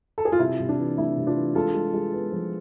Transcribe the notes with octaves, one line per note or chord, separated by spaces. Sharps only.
A4
G#4
F4
C3 E4
C3
D4
E3
A3 E4
C3
D4 F4
E3
G#3 F4 A4
G#3
G#3
B3
F3